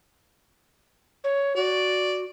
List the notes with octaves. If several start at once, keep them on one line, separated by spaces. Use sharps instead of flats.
C#5
F#4 D5